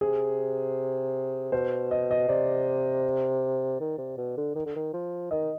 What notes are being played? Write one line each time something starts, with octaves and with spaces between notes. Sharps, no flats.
C3 G#4
B2 C5
D#5
D#5
C3 D5
D#3
C3
B2
D3
D#3
D3
D#3
F3
D#3 D#5